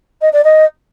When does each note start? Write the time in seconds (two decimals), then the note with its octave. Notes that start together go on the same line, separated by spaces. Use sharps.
0.21 D#5
0.32 D5
0.44 D#5